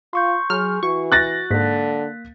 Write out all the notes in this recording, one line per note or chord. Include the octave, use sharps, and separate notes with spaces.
F4 C6 C#6 G6
F#3 G#4 F6
E3 F#4 C#6
F#6 A6 A#6
G#2 D3 A#3 B6